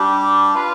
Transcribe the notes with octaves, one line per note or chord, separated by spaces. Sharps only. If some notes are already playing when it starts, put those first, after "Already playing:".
Already playing: G3 D4 G4
F4 B4 F5